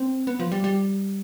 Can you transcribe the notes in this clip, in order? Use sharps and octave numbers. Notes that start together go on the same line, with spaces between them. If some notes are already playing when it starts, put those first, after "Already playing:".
Already playing: C4
B3
F3
G3
G3